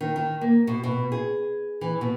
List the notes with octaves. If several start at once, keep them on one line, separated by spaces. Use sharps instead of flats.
D#3
D#3
A#3
B2
B2
G#4
E3
B2